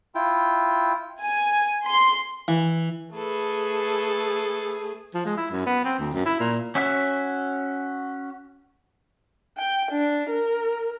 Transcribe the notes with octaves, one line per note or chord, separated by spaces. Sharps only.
E4 F4 G5
G#5
C6
E3
A3 G#4 A4 B4
F3
G#3
E4
F#2
B3
C4
D2
F#2
E4
A#2
C#4 F#4 E5
G5
D4
A#4